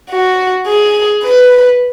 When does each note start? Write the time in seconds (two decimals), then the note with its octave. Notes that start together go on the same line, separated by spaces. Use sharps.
0.11 F#4
0.67 G#4
1.23 B4